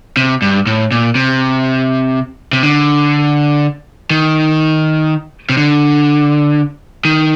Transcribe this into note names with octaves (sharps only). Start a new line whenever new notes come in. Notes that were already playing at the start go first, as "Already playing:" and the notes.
C3
G2
A2
A#2
C3
C3
D3
D#3
C3
D3
D#3